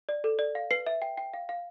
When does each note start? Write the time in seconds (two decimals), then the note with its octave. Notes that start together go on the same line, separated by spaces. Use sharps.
0.09 D5
0.24 A4
0.39 D5
0.55 F5
0.71 B4 C7
0.87 E5
1.02 G5
1.18 G5
1.34 F5
1.49 F5